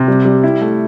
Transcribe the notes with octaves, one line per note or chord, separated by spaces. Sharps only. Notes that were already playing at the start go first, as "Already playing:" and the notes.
Already playing: C3
G3
G3
E4
A3